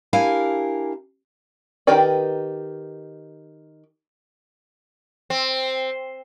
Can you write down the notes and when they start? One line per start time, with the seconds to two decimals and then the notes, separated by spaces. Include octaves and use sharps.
0.13 D4 E4 G4 A#4 F5 G#5
1.87 D#3 G4 A#4 B4 D5
5.30 C4